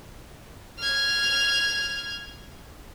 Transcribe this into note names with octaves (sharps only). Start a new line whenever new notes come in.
F6 G#6